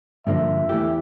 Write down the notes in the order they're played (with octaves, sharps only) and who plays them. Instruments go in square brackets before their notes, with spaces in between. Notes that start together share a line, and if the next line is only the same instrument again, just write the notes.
[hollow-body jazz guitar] G2 D3 F3 A#3 [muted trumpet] E5
[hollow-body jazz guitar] E2 E3 A3 E4 G4